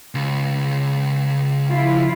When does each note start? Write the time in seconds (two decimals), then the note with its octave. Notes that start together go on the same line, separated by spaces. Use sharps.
0.15 C#2
1.69 F3 E4 F4